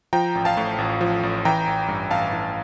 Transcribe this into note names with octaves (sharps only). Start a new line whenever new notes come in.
F3 G5 A#5
A1
F5 A5
A2
A1
F3
A1
E3 G5 A#5
A1
G2
A1 F5 A5
E3